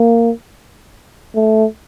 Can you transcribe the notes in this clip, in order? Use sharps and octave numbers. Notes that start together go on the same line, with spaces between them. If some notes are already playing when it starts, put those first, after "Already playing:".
Already playing: A#3
A3